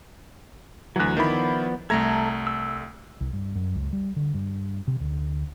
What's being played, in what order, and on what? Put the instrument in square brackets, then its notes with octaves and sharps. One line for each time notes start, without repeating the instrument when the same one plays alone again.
[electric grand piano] D2 E3 [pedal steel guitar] F#3 F#6
[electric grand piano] D#3 E4 B5 [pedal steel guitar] F3 B3 D5
[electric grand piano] C2 A3 G#6 [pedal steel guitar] A4 E5 A#5
[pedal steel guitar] E6
[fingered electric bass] C2
G2
F#2
C#2
G3
D3
G2
C3
D2